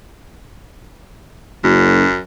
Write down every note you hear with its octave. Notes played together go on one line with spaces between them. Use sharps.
F#1 F#2